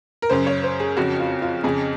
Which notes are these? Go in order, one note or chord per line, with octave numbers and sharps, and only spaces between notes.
A#4
F#2 C#3 C5
C#5
C5
G#4
F2 C#3 F#4
F4
F4
F2 C#3 G#4